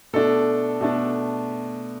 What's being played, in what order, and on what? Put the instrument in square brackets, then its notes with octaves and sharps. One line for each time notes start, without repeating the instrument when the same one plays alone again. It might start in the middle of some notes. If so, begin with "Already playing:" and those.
[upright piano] B2 A3 D4 [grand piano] A4
[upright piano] B2 A3 D4